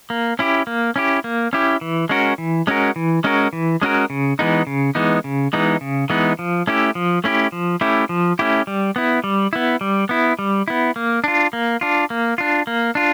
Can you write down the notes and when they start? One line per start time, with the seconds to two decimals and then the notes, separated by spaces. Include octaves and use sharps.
0.10 A#3
0.39 C#4 E4 G4
0.67 A#3
0.96 C#4 E4 G4
1.24 A#3
1.53 C#4 E4 G4
1.81 E3
2.09 G#3 C#4 F#4 A#4
2.38 E3
2.67 G#3 C#4 F#4 A#4
2.96 E3
3.24 G#3 C#4 F#4 A#4
3.53 E3
3.82 G#3 C#4 F#4 A#4
4.10 C#3
4.39 E3 G#3 B3 D#4
4.67 C#3
4.95 E3 G#3 B3 D#4
5.24 C#3
5.53 E3 G#3 B3 D#4
5.81 C#3
6.10 E3 G#3 B3 D#4
6.39 F3
6.67 A3 C#4 E4 G4
6.95 F3
7.24 A3 C#4 E4 G4
7.52 F3
7.81 A3 C#4 E4 G4
8.09 F3
8.39 A3 C#4 E4 G4
8.67 G3
8.96 B3 E4
9.24 G3
9.53 B3 E4
9.81 G3
10.09 B3 E4
10.39 G3
10.68 B3 E4
10.96 A#3
11.24 D4 F4
11.53 A#3
11.81 D4 F4
12.10 A#3
12.38 D4 F4
12.67 A#3
12.95 D4 F4